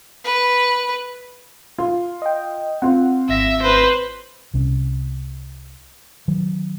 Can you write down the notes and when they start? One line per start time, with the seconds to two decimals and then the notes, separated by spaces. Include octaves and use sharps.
0.24 B4
1.78 F4
2.22 D#5 G5
2.82 C4 F4 F#5
3.29 G#1 E5 A#6 B6
3.62 B4 C5
4.54 C2 C3 C#4
6.28 D#3 F#3